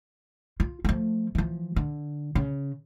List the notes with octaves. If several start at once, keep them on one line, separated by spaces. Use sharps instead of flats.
F4
F3 A3
E3 F3
D3
C#3